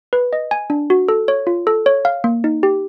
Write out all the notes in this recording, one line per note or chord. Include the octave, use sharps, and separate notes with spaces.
B4
D#5
G#5
D4
F#4
A4
C#5
F4
A4
C#5
F5
A#3
D#4
G4